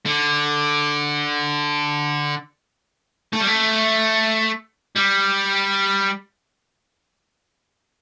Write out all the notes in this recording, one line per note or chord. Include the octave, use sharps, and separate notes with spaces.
D3
A3
G3
A3
G3